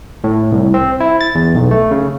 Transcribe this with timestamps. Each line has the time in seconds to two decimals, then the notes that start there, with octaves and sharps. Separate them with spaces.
0.24 A2
0.52 C2
0.74 C4
1.00 E4
1.21 A6
1.35 E2
1.55 B1
1.71 A3
1.91 C#3